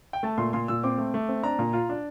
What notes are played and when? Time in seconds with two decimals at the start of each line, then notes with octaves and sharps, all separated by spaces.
0.13 G5
0.23 A3 A5
0.38 A#2 C6
0.53 A#2 C6
0.68 A#2 E6
0.83 C4 D6
0.98 A3
1.14 A3
1.29 C4
1.43 D4 A#5
1.59 A#2
1.73 F4
1.89 D4